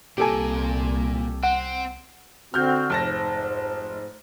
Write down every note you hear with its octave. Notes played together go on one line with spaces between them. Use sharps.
C2 A#2 G4 A4 G#5
C4 F#5
D3 C4 F#4 F6 G6
F1 G#2 A5 A#6